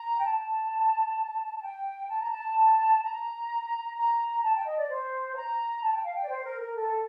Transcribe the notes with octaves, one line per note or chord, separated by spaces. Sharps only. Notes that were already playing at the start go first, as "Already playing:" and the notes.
Already playing: A#5
G5
A5
A5
G5
A5
A#5
A5
A#5
A#5
A5
G5
D#5
D5
C5
A#5
A5
G5
F5
G5
D5
C5
A#4
A#4
A4